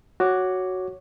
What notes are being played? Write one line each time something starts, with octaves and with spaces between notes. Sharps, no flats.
F#4 C#5 D6